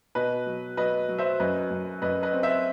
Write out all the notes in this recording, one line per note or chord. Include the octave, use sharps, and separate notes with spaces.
B2 B4 D#5
F#3
F#3 B4 D#5
F#3
C5 E5
F#2 B4 D#5
F#2
F#2 B4 D#5
B4 D#5
C4
C5 E5